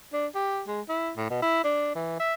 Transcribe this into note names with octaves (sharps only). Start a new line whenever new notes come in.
D4
G4
G#3
E4
A2
B2
E4
D4
E3
E5